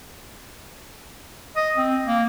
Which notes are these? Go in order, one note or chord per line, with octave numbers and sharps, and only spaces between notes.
D#5
C4
A#3